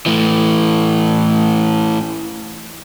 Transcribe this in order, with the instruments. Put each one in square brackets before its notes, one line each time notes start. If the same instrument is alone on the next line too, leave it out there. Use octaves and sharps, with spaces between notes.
[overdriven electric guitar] A2 E3